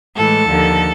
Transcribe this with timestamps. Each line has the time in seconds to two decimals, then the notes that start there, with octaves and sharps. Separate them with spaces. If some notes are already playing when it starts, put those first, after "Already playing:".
0.17 A2 E3 G#3 A4
0.47 D#2 D3 F3